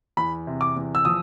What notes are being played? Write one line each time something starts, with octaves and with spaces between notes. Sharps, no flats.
E2 B5
C3
D6
E2
E6
F3 D#6